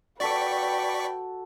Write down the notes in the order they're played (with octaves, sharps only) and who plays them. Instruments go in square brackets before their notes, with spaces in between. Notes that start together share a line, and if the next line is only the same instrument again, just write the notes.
[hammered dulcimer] F#4 A4 [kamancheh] B4 G5 [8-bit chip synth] D5 C#6 B6